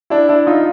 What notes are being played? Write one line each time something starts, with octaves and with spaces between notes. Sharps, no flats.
D4 E4
D4 E4
D#4 F4